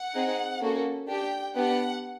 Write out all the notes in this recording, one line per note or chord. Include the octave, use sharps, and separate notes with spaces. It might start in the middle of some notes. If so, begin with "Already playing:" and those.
Already playing: F#5
C4 D#4 G#4
A#3 C#4 F#4 A4
D4 G4 G5
B3 D4 G4 F#5